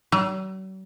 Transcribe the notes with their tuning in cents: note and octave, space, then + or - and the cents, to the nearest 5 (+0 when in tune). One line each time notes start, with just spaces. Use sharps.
F#3 +45